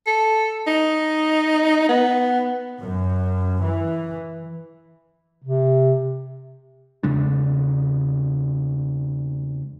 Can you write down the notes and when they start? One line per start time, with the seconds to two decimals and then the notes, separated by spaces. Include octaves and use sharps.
0.07 A4
0.67 D#4
1.89 B3
2.79 F#2
3.60 E3
5.43 C3
7.03 E2 C#3 G#3 D4